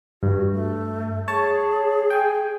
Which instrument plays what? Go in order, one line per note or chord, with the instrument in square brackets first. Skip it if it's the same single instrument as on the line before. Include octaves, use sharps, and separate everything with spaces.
[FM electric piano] G2 [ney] F#4
[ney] A3
[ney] G#4 [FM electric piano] C#5 A5
[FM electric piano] G5 G#5